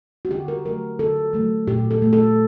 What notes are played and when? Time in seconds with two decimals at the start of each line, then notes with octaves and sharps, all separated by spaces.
0.25 F#4
0.31 D3 G4
0.48 A#4
0.65 F#3 A3 A#4
0.99 D3 A4
1.33 F#3 A3
1.67 A#2 G4
1.91 A4
2.02 A3
2.13 A4